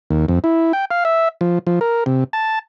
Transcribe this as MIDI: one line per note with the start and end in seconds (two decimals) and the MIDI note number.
0.11 0.26 39
0.29 0.39 41
0.44 0.73 64
0.73 0.85 79
0.91 1.04 77
1.05 1.28 76
1.41 1.59 53
1.67 1.79 53
1.81 2.04 70
2.06 2.24 48
2.33 2.59 81